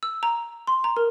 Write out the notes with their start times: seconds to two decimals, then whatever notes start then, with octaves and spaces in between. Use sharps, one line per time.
0.03 E6
0.23 A#5
0.67 C6
0.84 A#5
0.97 A#4